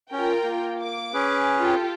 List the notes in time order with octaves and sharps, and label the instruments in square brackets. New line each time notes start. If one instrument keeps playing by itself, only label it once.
[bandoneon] C#4 [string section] F4 A#4 G5
[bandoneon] A#3
[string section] D6
[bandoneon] C#4 G#4 B4
[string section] F4 G4 A4